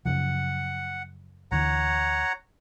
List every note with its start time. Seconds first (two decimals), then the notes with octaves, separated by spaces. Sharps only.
0.06 F#2 C#3 F3 F#5
1.52 D2 D3 E3 C#5 F#5 A#5